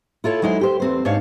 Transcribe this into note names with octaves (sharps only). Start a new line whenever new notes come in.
E4 F4 A4 C#5
F#3 G#3 D#4 E4 C5
G4 C5
E2 C4 C5
G#2 D4 C#5 F5